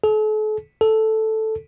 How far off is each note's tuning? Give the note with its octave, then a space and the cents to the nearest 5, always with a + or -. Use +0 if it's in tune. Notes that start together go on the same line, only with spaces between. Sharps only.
A4 -45
A4 -5